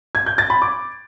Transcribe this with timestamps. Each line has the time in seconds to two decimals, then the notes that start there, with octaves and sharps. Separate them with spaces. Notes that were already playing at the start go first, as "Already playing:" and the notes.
0.15 G#6
0.26 G6
0.38 A6
0.50 B5
0.62 D6